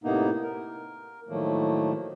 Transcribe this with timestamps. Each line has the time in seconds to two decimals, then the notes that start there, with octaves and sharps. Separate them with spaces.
0.04 A2 C3 A#3 B3 D#4
0.43 A#4
1.29 A2 D#3 F3 F#3 A3 A#3